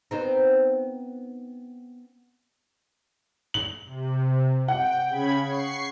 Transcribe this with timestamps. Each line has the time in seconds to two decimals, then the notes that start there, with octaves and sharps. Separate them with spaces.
0.11 B3 C4 D#4
3.54 F#7
3.85 C3
4.68 F#5 G5
5.08 C#3 B5 G#6
5.43 C#6 C7